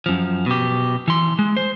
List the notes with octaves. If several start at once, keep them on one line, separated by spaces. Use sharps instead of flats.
F#2 F3
B2 G4
E3 C6
G#3
C5